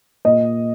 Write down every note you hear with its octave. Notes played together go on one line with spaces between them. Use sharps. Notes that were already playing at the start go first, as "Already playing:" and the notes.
A#2 D#5